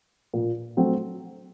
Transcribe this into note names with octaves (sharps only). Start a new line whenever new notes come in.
A#2
F#3 A3 C4